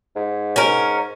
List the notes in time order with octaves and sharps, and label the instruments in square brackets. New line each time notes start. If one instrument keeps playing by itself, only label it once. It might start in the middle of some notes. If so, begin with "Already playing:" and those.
[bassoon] G#2
[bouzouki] C#4 A#4